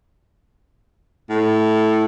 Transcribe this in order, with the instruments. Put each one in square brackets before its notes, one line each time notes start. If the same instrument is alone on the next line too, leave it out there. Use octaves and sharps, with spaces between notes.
[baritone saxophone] A2